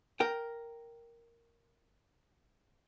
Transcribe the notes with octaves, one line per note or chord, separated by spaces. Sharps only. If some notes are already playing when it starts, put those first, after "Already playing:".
A#4 G5